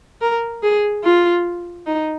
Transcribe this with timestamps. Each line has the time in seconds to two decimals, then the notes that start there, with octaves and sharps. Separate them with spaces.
0.22 A#4
0.63 G#4
1.04 F4
1.87 D#4